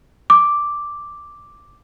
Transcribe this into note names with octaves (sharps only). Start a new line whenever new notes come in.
D6